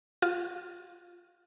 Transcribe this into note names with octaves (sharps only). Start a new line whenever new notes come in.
F4